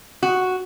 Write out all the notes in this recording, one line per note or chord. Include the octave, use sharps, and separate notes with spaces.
F#4